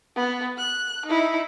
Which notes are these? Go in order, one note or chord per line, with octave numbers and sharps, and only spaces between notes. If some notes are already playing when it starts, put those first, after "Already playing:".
B3
F#6
D#4 E4